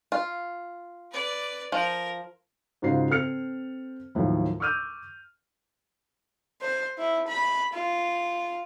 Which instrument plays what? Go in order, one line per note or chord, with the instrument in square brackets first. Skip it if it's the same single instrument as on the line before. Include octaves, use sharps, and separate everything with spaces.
[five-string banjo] F4
[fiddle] B4 D5
[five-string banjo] F3 [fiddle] A#4
[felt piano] G#2 C#3 F4 F#4 C5 C7
C4 A4 F6 C#7
D#2 A2 F3 F#3
C#6 D6 E6 F6 G6 D#7
[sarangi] C5
E4
B5
F4